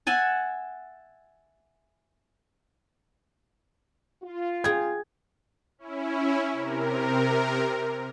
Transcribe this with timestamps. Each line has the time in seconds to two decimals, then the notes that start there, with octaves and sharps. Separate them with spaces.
0.07 E5 F#5 G#5 A5
4.23 F4
4.64 G#4 G5 G#6
5.78 C#4 E4
6.52 C3 A#4